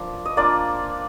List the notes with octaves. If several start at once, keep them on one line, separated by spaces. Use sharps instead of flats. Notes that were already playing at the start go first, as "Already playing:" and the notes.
Already playing: F3 A#3 D4
D#5
A#3 D4 F4 D5